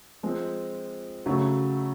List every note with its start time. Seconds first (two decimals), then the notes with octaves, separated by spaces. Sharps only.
0.23 F3 G#3 C4
1.26 C#3 F#3 A3 C#4